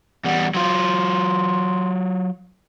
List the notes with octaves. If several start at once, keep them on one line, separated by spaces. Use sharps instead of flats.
E2 G3 F#5
F#3 F4 C6